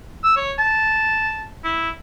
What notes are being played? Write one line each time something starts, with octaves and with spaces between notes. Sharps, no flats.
E6
C#5
A5
E4